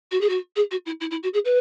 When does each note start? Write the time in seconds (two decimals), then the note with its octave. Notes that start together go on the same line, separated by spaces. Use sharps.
0.11 F#4
0.21 G#4
0.29 F#4
0.56 G#4
0.71 F#4
0.86 E4
1.01 E4
1.11 E4
1.23 F#4
1.34 G#4
1.45 B4